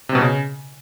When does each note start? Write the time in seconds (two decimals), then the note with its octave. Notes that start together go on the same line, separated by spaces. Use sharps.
0.09 C3
0.15 B2
0.21 C#3